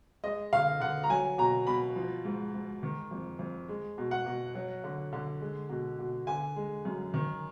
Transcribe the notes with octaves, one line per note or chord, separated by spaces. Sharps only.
G#3 D#5
D3 F5
D3 F#5
A#5
F#3 G#5
B2 A#5
B2 B5
F3
G#2
G#2
D#3
F2
F2
G#3
B2
F#5
B2
F#3
D3
D3
G#3
B2
B2
D3 G#5
G#3
F#2
D#3